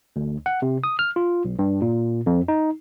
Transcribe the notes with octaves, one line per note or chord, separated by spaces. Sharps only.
D2
F#5
C3
D#6
F6
F4
B1
G2
A#2
F2
D#4